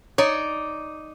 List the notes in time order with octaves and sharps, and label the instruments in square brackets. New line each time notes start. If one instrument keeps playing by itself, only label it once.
[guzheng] D#4 D5 [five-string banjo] C#5